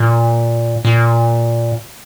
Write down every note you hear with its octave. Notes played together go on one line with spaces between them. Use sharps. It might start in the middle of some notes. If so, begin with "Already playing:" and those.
Already playing: A#2
A#2